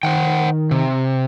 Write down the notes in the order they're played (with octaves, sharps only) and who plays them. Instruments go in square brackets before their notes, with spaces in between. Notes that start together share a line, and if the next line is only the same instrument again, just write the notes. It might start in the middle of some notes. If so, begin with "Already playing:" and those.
[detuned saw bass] D#3 [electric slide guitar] C5 F#5 G5
[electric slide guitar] C3